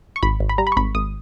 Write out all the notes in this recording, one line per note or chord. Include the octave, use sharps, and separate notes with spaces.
C#6
G#1 B5
G#1
B5
G3 A#5
B5
C#6
G#1 B5
G#1 D#6